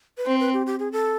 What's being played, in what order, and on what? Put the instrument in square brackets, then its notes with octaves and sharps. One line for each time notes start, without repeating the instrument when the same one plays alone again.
[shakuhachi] B4
[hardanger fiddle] C4 [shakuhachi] C5
[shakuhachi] B4
G4
G4
G#4
A4